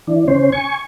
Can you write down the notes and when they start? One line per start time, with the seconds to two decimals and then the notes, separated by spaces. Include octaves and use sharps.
0.07 E3 D4
0.28 C#3 C#4 C5
0.52 G#5 C#6